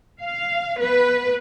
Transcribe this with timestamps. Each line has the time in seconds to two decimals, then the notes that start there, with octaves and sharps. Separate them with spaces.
0.21 F5
0.77 B3 B4